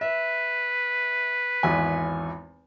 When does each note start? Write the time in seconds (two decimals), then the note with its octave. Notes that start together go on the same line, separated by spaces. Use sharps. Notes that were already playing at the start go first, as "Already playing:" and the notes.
0.01 B4 E5
1.63 G#1 E2 G#5